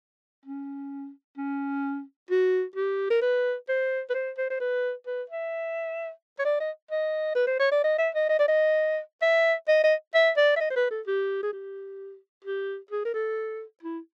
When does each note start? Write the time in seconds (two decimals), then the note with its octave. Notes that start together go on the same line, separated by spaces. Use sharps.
0.45 C#4
1.37 C#4
2.31 F#4
2.76 G4
3.10 A#4
3.22 B4
3.69 C5
4.10 B4
4.14 C5
4.38 C5
4.50 C5
4.60 B4
5.06 B4
5.30 E5
6.39 C#5
6.45 D5
6.60 D#5
6.91 D#5
7.35 B4
7.47 C5
7.59 C#5
7.72 D5
7.84 D#5
7.98 E5
8.15 D#5
8.29 D#5
8.39 D5
8.48 D#5
9.22 E5
9.68 D#5
9.83 D#5
10.14 E5
10.37 D5
10.56 E5
10.60 D#5
10.70 C5
10.76 B4
10.91 A4
11.07 G4
11.43 G#4
11.53 G4
12.44 G4
12.91 G#4
13.05 A#4
13.14 A4
13.83 E4